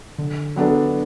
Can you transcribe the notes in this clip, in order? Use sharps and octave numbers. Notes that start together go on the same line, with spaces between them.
D3
F#3 B3 D4 A4